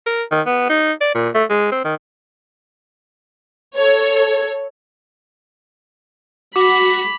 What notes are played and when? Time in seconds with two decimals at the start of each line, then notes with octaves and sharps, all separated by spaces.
0.06 A#4
0.31 D#3
0.46 B3
0.69 D#4
1.01 D5
1.15 A#2
1.34 A3
1.50 G#3
1.72 C4
1.85 D#3
3.77 A4 C#5
6.56 F#4 B5 D6